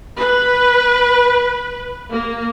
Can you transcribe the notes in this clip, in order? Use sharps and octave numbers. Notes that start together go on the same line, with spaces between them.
B4
A#3